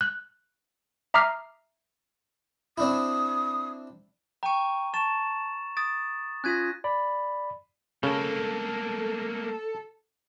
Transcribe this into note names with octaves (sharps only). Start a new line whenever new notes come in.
F#6
E5 A#5 D6 D#6 F6 C7
C4 D4 E4 D#6
G5 A#5 C#6 D#7
A5 C#6 A6 E7
D#6 A6 D7
C#4 F4 F#6 G#6 A#6 D#7
D5 B5
C#3 A3 A#3 A4